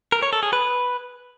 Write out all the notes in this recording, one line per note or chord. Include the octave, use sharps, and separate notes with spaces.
A#4
C#5
A4
G#4
B4